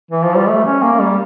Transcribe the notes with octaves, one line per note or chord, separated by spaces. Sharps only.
E3
F3
G3
A3
C#4
A#3
G3